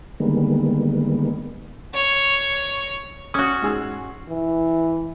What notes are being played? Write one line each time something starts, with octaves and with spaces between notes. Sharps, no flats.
D3 D#3 G3 G#3 A#3 B3
C#5
C#4 F#4 D#6
G#2 G#4 E6
E3